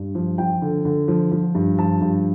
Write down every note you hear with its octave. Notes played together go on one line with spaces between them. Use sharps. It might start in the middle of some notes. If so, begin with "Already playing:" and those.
Already playing: G2
F3
F3 G5
D3
D3
F3
F3
G2
F3 A5
G2